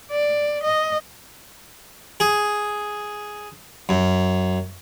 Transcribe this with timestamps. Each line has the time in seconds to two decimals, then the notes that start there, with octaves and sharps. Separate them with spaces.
0.12 D5
0.64 D#5
2.20 G#4
3.89 F#2